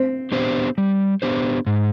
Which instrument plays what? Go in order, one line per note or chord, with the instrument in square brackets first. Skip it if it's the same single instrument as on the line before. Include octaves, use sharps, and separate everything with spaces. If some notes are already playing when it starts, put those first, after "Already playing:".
Already playing: [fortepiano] C4
[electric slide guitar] B3 D4 G4 C5
G3
B3 D4 G4 C5
G#2